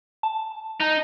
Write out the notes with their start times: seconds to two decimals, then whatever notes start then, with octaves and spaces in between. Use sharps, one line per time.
0.23 A5
0.80 D#4